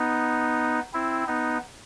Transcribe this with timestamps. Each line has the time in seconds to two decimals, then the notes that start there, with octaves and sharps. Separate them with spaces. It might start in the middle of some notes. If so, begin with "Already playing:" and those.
Already playing: B3 D#4
0.93 C4 E4
1.27 B3 D#4